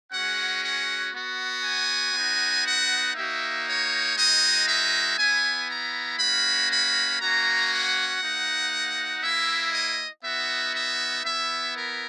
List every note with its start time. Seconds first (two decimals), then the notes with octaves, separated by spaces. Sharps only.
0.11 G#3 C#4 F#4 F#5
0.62 F#5
1.13 B3 F#4
1.63 G#5
2.14 B3 D#4 F#4
2.65 F#5
3.15 A#3 D#4 F#4 E5
3.66 C#5
4.16 G#3 D#4 F#4 D#5
4.67 E5
5.17 B3 E4 G#5
5.69 A#5
6.19 A#3 C#4 F#4 B5
6.70 B5
7.19 A#3 C#4 F#4 A#5
7.71 F#5
8.21 A#3 D#4 F#4
9.22 A#3 E4 E5
9.73 D#5
10.24 B3 D#4 F#4 E5
10.74 E5
11.25 B3 E4 E5
11.75 A#4